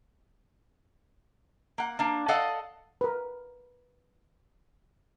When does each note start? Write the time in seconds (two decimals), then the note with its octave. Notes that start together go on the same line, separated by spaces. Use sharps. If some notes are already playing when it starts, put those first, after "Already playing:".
1.78 A#3 F#5
1.99 A#3 D4
2.28 A4 D5 D#5 F5 F#5
3.01 A#4 B4